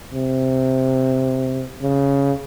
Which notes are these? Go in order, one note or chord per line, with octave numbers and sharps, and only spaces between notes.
C3
C#3